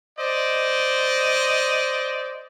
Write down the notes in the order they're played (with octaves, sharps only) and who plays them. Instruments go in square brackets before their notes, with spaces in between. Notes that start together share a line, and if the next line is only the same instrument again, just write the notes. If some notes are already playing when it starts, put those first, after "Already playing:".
[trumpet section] C5 D5 D#5